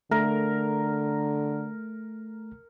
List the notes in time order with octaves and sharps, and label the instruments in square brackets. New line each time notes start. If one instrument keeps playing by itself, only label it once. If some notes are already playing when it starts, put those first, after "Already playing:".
[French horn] D3 [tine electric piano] A3 [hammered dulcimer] A#4